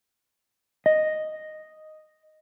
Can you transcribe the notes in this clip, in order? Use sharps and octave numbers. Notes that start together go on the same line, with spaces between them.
D#5